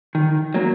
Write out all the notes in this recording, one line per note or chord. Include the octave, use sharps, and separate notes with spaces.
D#3
F#3 A#3